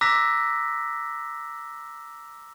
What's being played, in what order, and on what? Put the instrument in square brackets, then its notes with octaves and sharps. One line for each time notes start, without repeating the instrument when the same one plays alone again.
[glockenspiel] A#5 D6 E6 F#6 A#6 B6